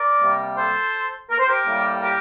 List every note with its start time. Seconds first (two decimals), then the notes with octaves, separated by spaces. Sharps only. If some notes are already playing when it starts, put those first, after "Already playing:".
Already playing: A#4 D5
0.21 C3 G3 A#3
0.57 A4 C5
1.30 A#4
1.39 C5
1.47 G4 A#4
1.66 A2 G3 A#3
2.02 G4 A#4